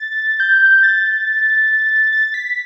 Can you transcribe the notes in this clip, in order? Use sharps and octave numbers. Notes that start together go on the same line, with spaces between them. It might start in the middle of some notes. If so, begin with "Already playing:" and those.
Already playing: A6
G6
A6
A6
B6